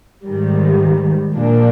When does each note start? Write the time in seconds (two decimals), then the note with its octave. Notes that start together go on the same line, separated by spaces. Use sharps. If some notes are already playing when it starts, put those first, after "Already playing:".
0.25 G#2 D#3 G3
1.34 A#2 F3 A#3 D4